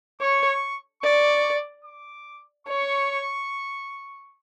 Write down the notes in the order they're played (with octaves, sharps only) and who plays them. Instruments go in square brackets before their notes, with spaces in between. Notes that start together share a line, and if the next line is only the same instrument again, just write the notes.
[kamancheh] C#5 [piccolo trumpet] C#6
[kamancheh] D5 [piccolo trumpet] C#6
[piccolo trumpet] D6
[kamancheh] C#5 [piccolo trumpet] C#6